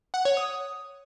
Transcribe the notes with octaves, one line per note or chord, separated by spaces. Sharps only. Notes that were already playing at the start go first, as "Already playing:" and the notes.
F#5
C#5
D#6